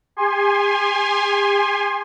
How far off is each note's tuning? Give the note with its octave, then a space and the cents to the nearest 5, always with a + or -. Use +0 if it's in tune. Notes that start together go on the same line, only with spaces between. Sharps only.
G4 +45 G#5 +0 C6 +15